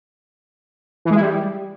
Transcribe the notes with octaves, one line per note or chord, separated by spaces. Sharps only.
E3
G#3
E4
G3